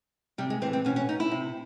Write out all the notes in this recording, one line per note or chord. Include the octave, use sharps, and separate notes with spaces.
C3 G3
G#3
E3 C4
C4
B2 C#4
C#4
D#4
E4
C3